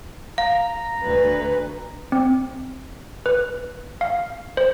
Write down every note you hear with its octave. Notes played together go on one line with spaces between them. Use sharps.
F5 A#5
D2 B4
C4
B4
F5
C5